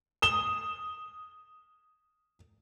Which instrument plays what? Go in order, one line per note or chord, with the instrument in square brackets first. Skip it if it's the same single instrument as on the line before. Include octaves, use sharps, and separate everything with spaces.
[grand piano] D#6 E7 G7